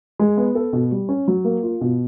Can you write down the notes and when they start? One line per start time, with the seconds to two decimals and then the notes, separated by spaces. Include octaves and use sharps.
0.19 G#3
0.37 B3
0.55 A4
0.73 B2
0.91 G3
1.09 C#4
1.28 F#3
1.45 A#3
1.63 F4
1.81 B2